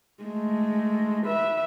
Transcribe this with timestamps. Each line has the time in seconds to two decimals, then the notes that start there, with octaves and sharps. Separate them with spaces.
0.24 G#3 A3
1.26 B4 E5